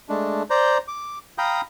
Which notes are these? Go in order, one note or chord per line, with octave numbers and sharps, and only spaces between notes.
G#3 A3 D4
C5 D5 A#5 G6
D6
F5 G5 A#5 B5 D#6 G6